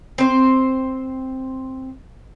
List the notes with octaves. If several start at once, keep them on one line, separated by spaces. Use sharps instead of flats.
C4 C5